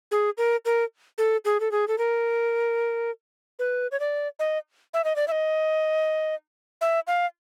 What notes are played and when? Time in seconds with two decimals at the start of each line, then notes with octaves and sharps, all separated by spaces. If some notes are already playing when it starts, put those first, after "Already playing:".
0.11 G#4
0.38 A#4
0.65 A#4
1.18 A4
1.45 G#4
1.60 A4
1.71 G#4
1.88 A4
1.98 A#4
3.59 B4
3.91 C#5
4.00 D5
4.39 D#5
4.94 E5
5.04 D#5
5.16 D5
5.28 E5
5.32 D#5
6.81 E5
7.07 F5